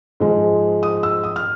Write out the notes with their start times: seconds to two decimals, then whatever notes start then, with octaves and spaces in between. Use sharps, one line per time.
0.20 G#2 F3 G#3
0.83 D#6
1.03 E6
1.24 D#6
1.36 F6